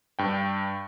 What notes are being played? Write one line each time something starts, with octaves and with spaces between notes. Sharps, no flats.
G2 G5